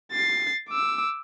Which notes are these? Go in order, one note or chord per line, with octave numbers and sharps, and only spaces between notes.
A6 C7
D6 E6